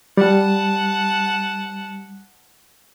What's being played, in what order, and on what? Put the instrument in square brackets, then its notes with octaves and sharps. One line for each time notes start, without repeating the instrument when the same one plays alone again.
[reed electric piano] G3 [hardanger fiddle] F#5 A5